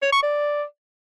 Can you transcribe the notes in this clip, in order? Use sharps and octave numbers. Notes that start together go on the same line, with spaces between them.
C#5
C#6
D5